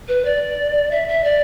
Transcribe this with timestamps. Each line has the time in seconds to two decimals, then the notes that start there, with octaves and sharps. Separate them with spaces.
0.08 B4
0.25 D5
0.91 E5
1.08 E5
1.24 D5